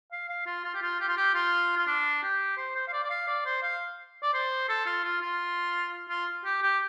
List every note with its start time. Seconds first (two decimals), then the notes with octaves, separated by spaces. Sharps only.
0.12 F5
0.29 F5
0.46 F4
0.64 F4
0.74 G4
0.82 F4
1.00 G4
1.08 F4
1.17 G4
1.34 F4
1.78 F4
1.87 D4
2.23 G4
2.57 C5
2.75 C5
2.88 F5
2.93 D5
3.04 D5
3.10 F5
3.28 D5
3.46 C5
3.63 F5
4.23 D5
4.34 C5
4.69 A4
4.86 F4
5.04 F4
5.21 F4
6.09 F4
6.45 G4
6.62 G4